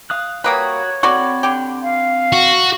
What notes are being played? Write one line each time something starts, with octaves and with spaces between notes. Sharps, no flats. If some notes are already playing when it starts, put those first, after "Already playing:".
F5 D#6 F#6
G3 A#3 F#4 B4 C#5 D#6
C4 F#4 A4 D5 B5 C#6
D3 G4
F5
F#4